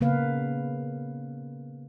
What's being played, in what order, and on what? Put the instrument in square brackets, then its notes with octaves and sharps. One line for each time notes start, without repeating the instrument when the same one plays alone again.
[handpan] C#3 A#3 B3 B4 F5